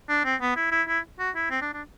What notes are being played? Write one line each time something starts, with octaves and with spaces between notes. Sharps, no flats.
D4
C4
B3
E4
E4
E4
F#4
E4
C4
D4
D4